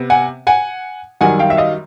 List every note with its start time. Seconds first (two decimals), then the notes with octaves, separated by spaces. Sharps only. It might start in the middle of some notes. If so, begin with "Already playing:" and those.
Already playing: C3 B3
0.10 F#5 G#5
0.47 F#5 G#5
1.21 F#2 D#3 G3 F#5 G#5
1.39 F5 G5
1.50 E5
1.57 D#5 F5